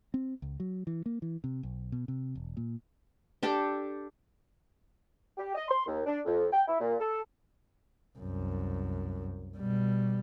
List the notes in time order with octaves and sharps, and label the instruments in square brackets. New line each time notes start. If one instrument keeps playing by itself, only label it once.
[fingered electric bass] C4
C#2
F#3
E3
A#3
E3
C3
B1
B2
C3
E1
A#2
[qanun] D4 G4 A4
[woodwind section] G4
D#5
C6
D#2
D4
F2
G5
E4
A#2
A4
[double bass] C2 F#2
B2 G3